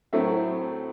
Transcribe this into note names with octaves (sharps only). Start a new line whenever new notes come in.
A2 F#3 A3 C4 E5